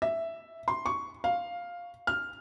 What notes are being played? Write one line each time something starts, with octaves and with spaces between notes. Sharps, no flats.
E5
C6
C#6
F5
F6